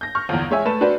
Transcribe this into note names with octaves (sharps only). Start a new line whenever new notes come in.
G6 A#6
C#6 F6
G1 E2
G#3 C#5 E5 G#5
A3 B4 A5 E7
D4 F#4 B4 C5 D5